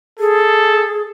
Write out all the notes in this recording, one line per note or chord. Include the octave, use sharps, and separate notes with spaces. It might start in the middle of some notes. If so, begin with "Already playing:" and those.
G#4 A4